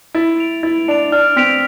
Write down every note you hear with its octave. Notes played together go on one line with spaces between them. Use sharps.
E4 A6
D7 F7
E4 A6
D4 D7 F7
D4 F6
C4 B6 D7 F7